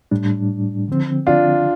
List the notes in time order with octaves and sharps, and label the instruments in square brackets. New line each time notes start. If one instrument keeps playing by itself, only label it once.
[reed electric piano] A2 G3 D4
D3 F3 C4
[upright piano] D4 F4